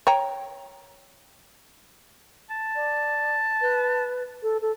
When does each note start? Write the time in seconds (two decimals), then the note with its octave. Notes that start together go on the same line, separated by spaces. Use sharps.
0.07 C#5 G5 A#5
2.50 A5
2.76 D5
3.62 B4
4.43 A4
4.62 A4